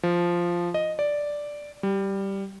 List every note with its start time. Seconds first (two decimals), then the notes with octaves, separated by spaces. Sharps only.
0.03 F3
0.74 D#5
0.99 D5
1.83 G3